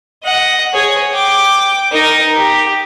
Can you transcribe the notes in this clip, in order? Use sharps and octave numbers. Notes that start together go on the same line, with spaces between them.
D#5 F#5
G#4 C#5
G5 D6
D#4 A#4
G4